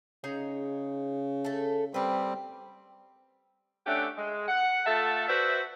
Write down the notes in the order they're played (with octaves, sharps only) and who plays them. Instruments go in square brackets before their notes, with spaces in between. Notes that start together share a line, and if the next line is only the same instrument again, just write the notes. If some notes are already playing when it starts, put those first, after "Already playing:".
[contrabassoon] C#3 [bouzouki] D#4 G#4 A#5
[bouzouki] A3 A4
[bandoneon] G3 C4 [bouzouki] A#3 B4
[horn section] A3 C#4 D4 G4 E5 F#5
G#3
F#5
A3 F4 A4 E5 F#5 A5
F#4 B4 C5 D5 E5